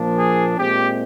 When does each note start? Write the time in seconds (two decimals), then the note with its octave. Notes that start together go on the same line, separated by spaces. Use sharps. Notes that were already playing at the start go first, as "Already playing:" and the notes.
Already playing: A#2 F3 A#3 D4
0.17 G#4
0.58 A#2 G#3 C4 G4